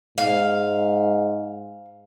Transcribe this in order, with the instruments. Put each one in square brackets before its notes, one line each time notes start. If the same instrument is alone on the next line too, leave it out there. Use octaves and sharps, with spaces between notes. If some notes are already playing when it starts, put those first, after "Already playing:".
[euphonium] G#2 [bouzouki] F5